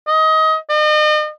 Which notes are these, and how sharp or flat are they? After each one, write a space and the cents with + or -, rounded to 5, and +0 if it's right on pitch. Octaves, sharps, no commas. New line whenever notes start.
D#5 +25
D#5 -40